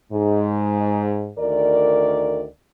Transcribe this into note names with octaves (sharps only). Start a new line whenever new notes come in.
G#2
D2 D#3 A#4 D5